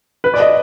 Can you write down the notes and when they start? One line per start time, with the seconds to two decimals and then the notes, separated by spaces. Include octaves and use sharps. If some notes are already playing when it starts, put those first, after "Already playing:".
0.24 B4
0.34 D5
0.40 D#5